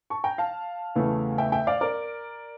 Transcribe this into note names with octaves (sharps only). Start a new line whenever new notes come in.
A5 C#6
G5 A#5
F5 A5
E2 C#3 E3 A3
E5 G5
E5 G5
D5 F5
A#4 D5